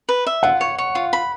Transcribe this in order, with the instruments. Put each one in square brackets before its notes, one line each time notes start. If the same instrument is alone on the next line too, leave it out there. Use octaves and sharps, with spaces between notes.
[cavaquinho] B4
E5
[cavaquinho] F4 [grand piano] F#5
[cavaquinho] C#5
C#5
F4
B5